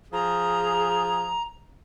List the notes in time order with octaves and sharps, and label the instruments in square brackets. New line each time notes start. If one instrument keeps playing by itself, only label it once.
[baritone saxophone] F3 [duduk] G#4 [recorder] A#5